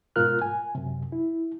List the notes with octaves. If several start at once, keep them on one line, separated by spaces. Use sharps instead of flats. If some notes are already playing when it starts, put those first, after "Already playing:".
G#2 B2 F4 A#4 F6 F#6
G#5
F#2 C3
E4